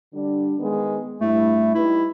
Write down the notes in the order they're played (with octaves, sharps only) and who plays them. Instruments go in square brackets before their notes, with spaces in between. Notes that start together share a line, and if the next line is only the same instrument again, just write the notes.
[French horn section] D3 G3 D4
D#3 G#3 B3
[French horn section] G2 E4 [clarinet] A3
[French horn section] G3 D#4 B4 [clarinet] E4